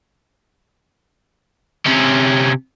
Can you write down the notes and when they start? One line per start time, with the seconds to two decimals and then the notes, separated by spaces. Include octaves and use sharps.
1.86 C3 C#4